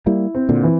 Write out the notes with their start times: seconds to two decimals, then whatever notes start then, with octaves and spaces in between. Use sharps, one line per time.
0.06 G3 A#3 E4
0.35 C4
0.49 A#2 D3
0.63 E3